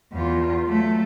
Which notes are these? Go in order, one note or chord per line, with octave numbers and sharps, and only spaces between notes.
E2 F4
F#3 A3